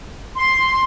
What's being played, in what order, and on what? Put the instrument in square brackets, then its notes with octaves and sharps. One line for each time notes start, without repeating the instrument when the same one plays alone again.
[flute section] C6